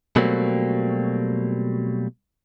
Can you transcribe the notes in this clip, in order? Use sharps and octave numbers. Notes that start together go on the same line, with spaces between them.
B2 F#3 G3 A3 A#3 C4